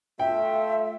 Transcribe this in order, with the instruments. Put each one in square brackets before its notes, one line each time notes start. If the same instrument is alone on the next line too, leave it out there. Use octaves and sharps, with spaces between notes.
[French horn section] A3 F4 [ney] E5 [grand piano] G5